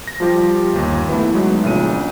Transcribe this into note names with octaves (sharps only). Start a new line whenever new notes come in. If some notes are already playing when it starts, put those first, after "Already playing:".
A#6
F3 G3 F4 G4
G1 D#2
A3 B3 E4 B4
F#3 G#3 B3 D#4
A#1 A#2 C#3 D#7